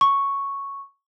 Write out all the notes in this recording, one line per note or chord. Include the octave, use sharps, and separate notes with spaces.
C#6